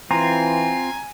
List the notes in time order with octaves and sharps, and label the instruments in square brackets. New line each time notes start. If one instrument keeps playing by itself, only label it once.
[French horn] E3 [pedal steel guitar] C4 F4 [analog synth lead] G#5 [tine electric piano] A#5